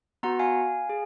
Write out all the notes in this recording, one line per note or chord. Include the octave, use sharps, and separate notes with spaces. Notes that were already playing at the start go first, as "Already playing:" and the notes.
B3 F#4 F#5 A#5
F5 G#5
G#4